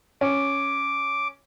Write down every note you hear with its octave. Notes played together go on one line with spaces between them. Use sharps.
C#4 D6